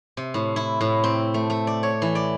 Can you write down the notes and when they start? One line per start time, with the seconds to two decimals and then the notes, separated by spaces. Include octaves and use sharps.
0.17 C3
0.34 A2
0.56 E4
0.81 A2
1.04 C4
1.34 A3
1.50 A3
1.67 D5
1.83 C#5
2.02 E3
2.15 D5